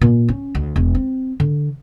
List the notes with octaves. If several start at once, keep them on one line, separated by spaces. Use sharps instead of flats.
A#2
C#4
D2
E1
C4
D3